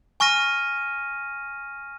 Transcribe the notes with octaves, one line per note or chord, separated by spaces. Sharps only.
G#5 C#6 F6 A#6 D#7